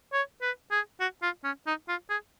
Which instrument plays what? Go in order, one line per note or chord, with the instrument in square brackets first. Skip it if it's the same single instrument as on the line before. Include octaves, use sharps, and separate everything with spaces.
[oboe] C#5
B4
G#4
F#4
F4
C#4
D#4
F4
G#4